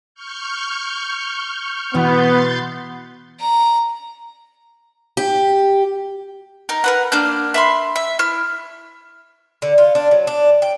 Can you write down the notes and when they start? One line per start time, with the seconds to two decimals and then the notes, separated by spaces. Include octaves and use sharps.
0.15 C#6 F6 G6
1.94 B2 E3 B3 C6 G6 A6
3.40 A#5
5.17 G4
6.69 D#4 A#4
6.84 A#4 B4 F#5
7.12 A#3 D4 F6 G6
7.54 E5 B5 C6
7.96 E5
8.19 E4 F6
9.62 D3
9.78 F4
9.95 D4
10.11 F#3
10.27 D4
10.62 G5